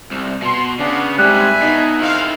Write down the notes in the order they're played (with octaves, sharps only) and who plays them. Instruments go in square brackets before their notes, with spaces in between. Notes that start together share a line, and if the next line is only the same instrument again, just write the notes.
[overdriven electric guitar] C2
[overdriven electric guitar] B2 [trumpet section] C6
[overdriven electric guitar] C#3 [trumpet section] B3 [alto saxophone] D4
[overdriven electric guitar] G#2 C3 [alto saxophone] G3 [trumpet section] E5 G#5 B5 [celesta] F#6
[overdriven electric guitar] B2 [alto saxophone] D#4
[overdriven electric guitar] D#3 E4 [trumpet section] G#3 C4 F5